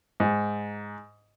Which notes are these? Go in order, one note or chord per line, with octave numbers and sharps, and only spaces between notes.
G#2